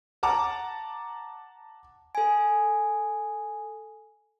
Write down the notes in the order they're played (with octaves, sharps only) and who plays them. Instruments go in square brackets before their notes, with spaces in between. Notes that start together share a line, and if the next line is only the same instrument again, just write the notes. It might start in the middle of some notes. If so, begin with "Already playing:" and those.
[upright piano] F#5 A5 A#5 D6
[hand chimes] A4 G#5